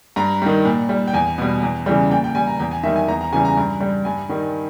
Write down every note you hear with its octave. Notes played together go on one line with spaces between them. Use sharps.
G2 A#5
D#3 G3
A#2
G3
G5
E2 G#5
B2 G3
E2
C#3 E3 G3
A#2 G5
G5
G3 G#5
A#5
E2 G5
G#5
D#3 G3 E5
G#5
E2 A#5
A#5
C#3 E3 G3 G#5
A#5
G2
G3
G2 G#5
D#3 G3